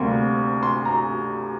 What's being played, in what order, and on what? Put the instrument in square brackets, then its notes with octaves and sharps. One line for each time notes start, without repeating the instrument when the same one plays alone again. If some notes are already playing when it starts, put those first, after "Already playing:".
Already playing: [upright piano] D2 C3 G3 A#3 C6
C6
A#5